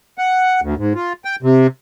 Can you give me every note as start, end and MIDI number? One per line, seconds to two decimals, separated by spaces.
0.18 0.60 78
0.62 0.75 38
0.78 0.93 44
0.95 1.13 65
1.25 1.36 79
1.43 1.67 48